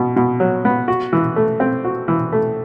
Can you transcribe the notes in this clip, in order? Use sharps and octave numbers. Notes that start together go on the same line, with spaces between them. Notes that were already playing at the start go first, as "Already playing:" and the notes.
Already playing: B2
B2
F#3
B3
F#4
E3
A3
C4
F#4
E3
A3